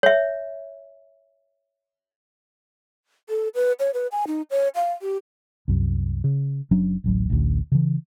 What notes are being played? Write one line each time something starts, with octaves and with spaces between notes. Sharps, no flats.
C#5 E5
A4
B4
C#5
B4
G#5
D#4
C#5
F5
G4
C2 F#2
C#3
F#1 F#3 C#4 D4
D1 A1 F#3
A1 D2
C#3 E3